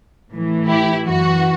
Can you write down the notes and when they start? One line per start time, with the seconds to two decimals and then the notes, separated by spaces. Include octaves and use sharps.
0.31 A2 E3
0.67 E4 G4
1.05 F#2 E3 F#4